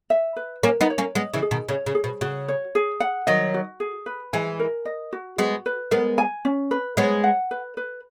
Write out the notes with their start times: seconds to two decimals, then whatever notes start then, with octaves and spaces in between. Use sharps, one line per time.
0.10 E5
0.36 B4
0.63 A#3 C#4 A#4
0.81 B3 D#4
0.90 C#5
0.98 A#3 C#4
1.15 G#3 B3 D#5
1.34 C#3 E3
1.42 G#4
1.51 B2 D#3
1.69 C#3 C#5
1.86 C#3
1.95 G#4
2.04 B2
2.21 C#3 F#4
2.48 C#5
2.75 G#4
3.00 F#5
3.27 D#3 F#3 D#5
3.54 F#4
3.80 G#4
4.06 B4
4.33 E3 G#3 G#5
4.59 A#4
4.85 D#5
5.13 F#4
5.38 G#3 B3 F#4
5.66 B4
5.91 G#3 B3 A#4
6.18 G#5
6.45 C#4
6.71 B4
6.97 G#3 B3 C#5
7.24 F#5
7.51 B4
7.77 B4